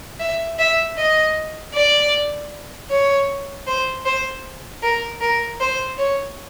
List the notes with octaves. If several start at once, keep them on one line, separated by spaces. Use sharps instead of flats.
E5
E5
D#5
D5
C#5
C5
C5
A#4
A#4
C5
C#5